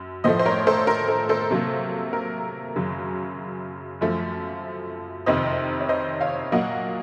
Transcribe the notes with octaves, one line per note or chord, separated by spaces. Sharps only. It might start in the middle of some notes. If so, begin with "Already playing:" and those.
Already playing: F#2
A2 F3 A3 C5 D#5
C5
A#4 C#5
A4 C5
A#4
A4
A4 C5
C3 F#3 A#3
A#4
F#2 C#3 F#3
F#2 F3 A3
F2 C3 D#3 C5 D#5
C#5
C5 D#5
C#5 F5
A#2 F#3 A#3 D#5 F#5